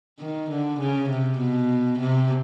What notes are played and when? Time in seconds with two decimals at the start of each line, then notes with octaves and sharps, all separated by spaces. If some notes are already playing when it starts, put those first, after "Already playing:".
0.19 D#3
0.50 D3
0.79 C#3
1.09 C3
1.39 B2
1.99 C3